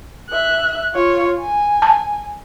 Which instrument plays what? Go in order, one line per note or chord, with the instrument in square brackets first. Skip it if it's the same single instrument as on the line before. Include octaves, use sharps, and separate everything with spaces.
[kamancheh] E5 F#6
F4 C#5
G#5
[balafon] A5